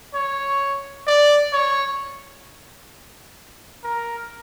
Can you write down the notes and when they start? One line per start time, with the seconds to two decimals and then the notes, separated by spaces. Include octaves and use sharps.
0.14 C#5
1.07 D5
1.53 C#5
3.84 A#4